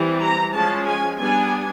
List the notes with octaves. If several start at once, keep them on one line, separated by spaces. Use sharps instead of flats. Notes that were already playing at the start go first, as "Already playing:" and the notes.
Already playing: E3 G3 C4
A#5
F3 G#3 C#4 A5
G#5
G3 B3 D4 G#5